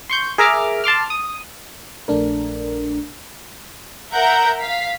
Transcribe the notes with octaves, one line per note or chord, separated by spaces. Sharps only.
C6 C#6 G6
G#4 A#4 E5 A#5 D6 F6
A5 C6 D6 F6
D#6
A#1 A3 D4 A#4
A#4 E5 F#5 A#5 G6
F5 B6